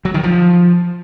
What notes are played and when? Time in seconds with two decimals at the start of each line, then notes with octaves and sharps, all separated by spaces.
0.05 F#3
0.14 D#3
0.24 F3